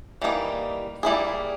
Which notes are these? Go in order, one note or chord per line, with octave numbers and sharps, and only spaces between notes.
E3 G3 A#3 D#4
G3 A#3 E4 G#4